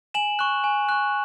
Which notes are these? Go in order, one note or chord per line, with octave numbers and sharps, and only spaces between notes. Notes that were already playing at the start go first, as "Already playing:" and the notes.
G#5 E7 F#7
C#6 F#6
G#5
C#6 F#6